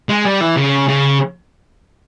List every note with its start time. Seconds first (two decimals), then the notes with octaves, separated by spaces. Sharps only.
0.09 G#3
0.25 G3
0.41 E3
0.57 C#3
0.88 C#3